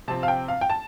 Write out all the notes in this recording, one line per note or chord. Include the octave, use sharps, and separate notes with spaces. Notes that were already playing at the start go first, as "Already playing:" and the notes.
C3 F3 C4 A5
F5
G5
F5
G5
A5